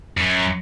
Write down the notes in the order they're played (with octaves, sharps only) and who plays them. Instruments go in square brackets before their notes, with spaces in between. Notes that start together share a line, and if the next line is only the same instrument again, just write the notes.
[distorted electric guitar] F#2